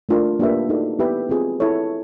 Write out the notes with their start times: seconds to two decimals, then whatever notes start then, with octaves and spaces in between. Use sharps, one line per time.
0.09 A3 D4 F4 A#4
0.40 A#3 D4 G4 B4 E5
0.69 D#4 F#4 A4 D5
0.99 B3 E4 G4 B4 E5
1.29 C4 F4 G#4
1.60 E4 A4 C#5